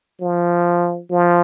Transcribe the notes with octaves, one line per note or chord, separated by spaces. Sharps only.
F3
F3